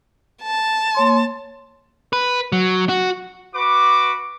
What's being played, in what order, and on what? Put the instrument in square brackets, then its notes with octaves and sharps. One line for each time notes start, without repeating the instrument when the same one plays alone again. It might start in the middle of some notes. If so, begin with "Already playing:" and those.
[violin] A5
[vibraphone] A#3 C#5 C6
[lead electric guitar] B4
F#3
F#4
[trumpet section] F#4 B4 D6